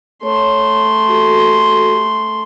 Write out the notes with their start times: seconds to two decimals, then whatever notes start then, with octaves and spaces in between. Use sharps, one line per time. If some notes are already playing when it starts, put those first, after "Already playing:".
0.23 A3 C#5 C6
1.08 F#4 G4 A4